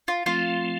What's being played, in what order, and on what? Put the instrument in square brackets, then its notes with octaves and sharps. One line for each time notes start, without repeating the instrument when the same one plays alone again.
[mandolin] F4
[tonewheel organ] F3 A3 C4 [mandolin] F4